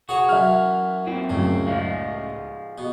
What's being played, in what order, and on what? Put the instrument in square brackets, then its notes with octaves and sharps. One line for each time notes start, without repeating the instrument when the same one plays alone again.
[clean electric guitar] F#4 [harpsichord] G#4 C#5
[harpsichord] F#2 E3 [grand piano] E5 F6
[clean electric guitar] A#2 C4 [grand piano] E4
[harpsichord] C#2 A2 [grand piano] F#2
[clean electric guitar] F3 G#3 [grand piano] F5
[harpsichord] B2